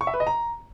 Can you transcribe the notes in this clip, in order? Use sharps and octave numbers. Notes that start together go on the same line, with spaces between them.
C#6
E5
B4
D#5
A#5